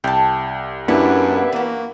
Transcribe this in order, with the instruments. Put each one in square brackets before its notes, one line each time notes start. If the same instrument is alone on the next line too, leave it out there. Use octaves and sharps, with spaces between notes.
[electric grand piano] C2 [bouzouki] G5 A5
[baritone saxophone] F#2 [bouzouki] E3 A#3 B4 [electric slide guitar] B3 [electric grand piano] D4 E4 G4
[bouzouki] E3 F#4 [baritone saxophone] A#3